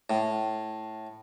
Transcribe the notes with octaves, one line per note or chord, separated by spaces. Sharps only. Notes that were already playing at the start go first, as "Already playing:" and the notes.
A2